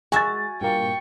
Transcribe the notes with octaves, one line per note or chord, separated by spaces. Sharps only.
G#3 F#4 E5 G#5 A6
G2 A#2 A#3 G5 C#6